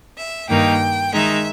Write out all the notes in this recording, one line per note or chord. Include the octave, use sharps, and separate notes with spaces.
E5
G2 D#3 A#3 D#4 G5
D#3 G#3 D#4 E5